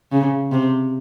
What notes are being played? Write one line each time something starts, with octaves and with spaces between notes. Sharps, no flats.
C#3
C3